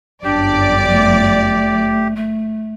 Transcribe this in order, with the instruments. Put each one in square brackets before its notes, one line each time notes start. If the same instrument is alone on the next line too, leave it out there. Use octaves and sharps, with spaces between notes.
[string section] G1 F#2 D5 [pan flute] D4 [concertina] G4
[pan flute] A3
A3